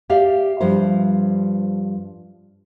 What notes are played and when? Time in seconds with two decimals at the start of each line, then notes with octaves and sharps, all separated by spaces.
0.10 G4 D5 E5 F5
0.61 G2 F3 G3 C5